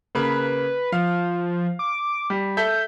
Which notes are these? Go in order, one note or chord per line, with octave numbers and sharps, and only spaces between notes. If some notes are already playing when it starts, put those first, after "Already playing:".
C#3 A#3 B4
F3 F5
D6
G3
A4 E5 G6